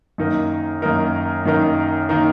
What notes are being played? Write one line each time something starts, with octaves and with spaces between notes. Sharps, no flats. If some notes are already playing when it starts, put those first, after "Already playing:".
F#2 D#3 A#3 D#4 A#4
F#2 D#3 A#3 D#4 A#4
F#2 D#3 A#3 D#4 A#4
D#3 A#3 D#4 A#4